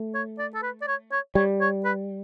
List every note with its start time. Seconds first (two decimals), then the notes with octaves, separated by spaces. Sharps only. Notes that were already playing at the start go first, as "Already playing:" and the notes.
Already playing: A3
0.14 C#5
0.39 D5
0.54 A4
0.63 B4
0.82 D5
0.87 C#5
1.12 C#5
1.35 G3 C#5
1.61 C#5
1.84 B4